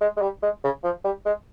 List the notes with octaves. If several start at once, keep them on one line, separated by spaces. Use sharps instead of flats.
G#3
G#3
G3
G#3
C#3
F3
G3
G#3